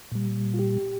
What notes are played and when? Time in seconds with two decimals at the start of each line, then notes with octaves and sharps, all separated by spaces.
0.12 A#2 G3
0.54 F4
0.59 G4